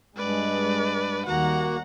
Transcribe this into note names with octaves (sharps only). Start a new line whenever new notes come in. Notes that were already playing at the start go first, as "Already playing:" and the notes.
G2 G#3 B4 D5
D#2 G3 A#3 F#4 F#5 A#5